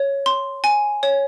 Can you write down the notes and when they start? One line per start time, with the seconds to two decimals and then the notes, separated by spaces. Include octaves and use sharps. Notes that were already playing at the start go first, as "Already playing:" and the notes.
Already playing: C#5
0.26 C6
0.64 G#5
1.03 C#5